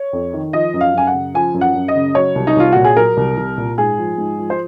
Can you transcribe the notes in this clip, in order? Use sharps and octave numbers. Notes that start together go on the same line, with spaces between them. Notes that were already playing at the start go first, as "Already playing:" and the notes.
Already playing: C#5
F2
D#3
F3 D#5
F#2
F5
F#2 G#5
F#5
C#3
F3 G#5
F#2
F#5
F#2
D#5
C#3
F#3 C#5
C2
D#4
C2 F4
A#2 F#4
G#4
F#3 A#4
C2
C2
A#2
G#2 G#4
F3
G#2
F3
C5